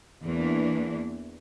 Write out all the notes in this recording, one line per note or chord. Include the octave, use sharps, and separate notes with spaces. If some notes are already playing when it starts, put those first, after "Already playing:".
E2 E3 A#3 D4